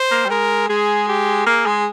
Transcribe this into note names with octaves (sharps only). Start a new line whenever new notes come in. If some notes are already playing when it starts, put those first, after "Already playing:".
Already playing: C5
A#3
G3
G#3 A#4
G#3 G#4
G4
A#3 G#4
G#3